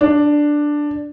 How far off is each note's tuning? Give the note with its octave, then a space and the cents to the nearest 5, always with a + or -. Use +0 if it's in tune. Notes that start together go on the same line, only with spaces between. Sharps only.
D4 +5